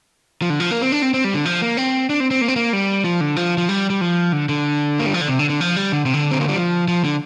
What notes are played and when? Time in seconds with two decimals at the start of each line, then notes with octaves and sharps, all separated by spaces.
0.42 F3
0.50 D3
0.60 F3
0.71 A#3
0.82 C4
0.92 D4
1.02 C4
1.14 C4
1.24 G3
1.35 D3
1.45 F3
1.62 A#3
1.77 C4
2.10 D4
2.20 C4
2.31 C4
2.41 A#3
2.48 C4
2.56 A#3
2.73 G3
3.05 F3
3.21 D3
3.36 F3
3.58 F3
3.69 G3
3.90 G3
4.01 F3
4.32 D3
4.49 D3
4.99 A#3
5.06 G3
5.14 F3
5.21 D3
5.28 C3
5.39 D3
5.50 D3
5.61 F3
5.76 G3
5.92 D3
6.06 C3
6.14 D3
6.31 C4
6.40 A#3
6.48 G3
6.56 F3
6.88 F3
7.04 D3